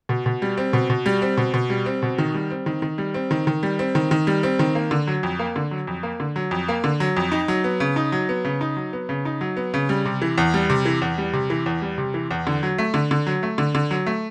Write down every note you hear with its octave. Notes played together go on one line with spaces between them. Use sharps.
B2
B2
G3
C4
B2
B2
G3
C4
B2
B2
G3
C4
B2
D#3
G3
C4
D#3
D#3
G3
C4
D#3
D#3
G3
C4
D#3
D#3
G3
C4
D#3
A#3
D3
F#3
F2
A#3
D3
F#3
F2
A#3
D3
F#3
F2
A#3
D3
F#3
F2
D#4
F#3
B3
C#3
D#4
F#3
B3
C#3
D#4
F#3
B3
C#3
D#4
F#3
B3
C#3
G3
C3
E3
E2
G3
C3
E3
E2
G3
C3
E3
E2
G3
C3
E3
E2
D3
F#3
A3
D3
D3
F#3
A3
D3
D3
F#3
A3